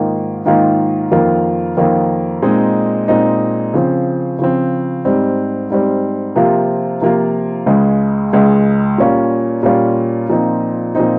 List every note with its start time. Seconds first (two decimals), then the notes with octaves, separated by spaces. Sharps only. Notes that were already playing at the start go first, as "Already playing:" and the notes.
Already playing: G#2 D#3 A#3 F4
0.45 G#2 D#3 A#3 F4
1.11 F2 D#3 A#3 F4
1.77 F2 D#3 A#3 F4
2.42 A#2 G#3 C4 D#4
3.08 A#2 G#3 C4 D#4
3.74 C#3 F3 C4
4.39 C#3 F3 C4
5.05 G#2 G3 C4
5.70 G#2 G3 C4
6.36 C3 F3 A#3 F4
7.01 C3 F3 A#3 F4
7.66 C#2 C#3 G#3
8.33 C#2 C#3 G#3
8.98 A#2 G3 C#4 F4
9.63 A#2 G3 C#4 F4
10.29 A#2 F3 C4 D#4
10.95 A#2 F3 C4 D#4